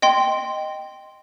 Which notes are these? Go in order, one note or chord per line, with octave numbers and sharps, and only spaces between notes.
D#5 G5 C6